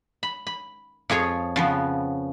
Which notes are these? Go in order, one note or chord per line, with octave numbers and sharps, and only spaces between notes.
B5
B5
F2 F3 G#4 C#5
C#3 F3 B3